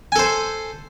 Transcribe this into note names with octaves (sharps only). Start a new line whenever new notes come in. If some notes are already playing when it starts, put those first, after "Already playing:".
A4 C5 G#5